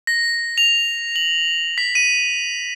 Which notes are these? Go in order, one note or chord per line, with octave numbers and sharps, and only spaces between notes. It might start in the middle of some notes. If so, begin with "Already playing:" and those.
A#6
F7
F#7
B6
D#7